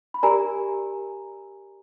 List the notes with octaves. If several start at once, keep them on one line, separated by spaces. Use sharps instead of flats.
B5
G4 A#4 D5 G#5 A#5